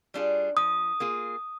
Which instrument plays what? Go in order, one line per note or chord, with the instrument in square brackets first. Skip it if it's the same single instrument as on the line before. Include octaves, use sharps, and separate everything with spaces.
[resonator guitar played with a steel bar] G3 D4 F4 G#4
[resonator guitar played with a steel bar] F3 [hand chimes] D#6
[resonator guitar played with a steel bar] A#3 F4 G#4